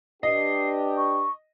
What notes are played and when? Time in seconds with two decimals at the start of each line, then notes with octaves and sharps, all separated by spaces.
0.23 D4 G4 B4 D#5 C7
0.97 C#6